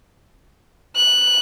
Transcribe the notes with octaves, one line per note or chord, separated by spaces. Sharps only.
F#6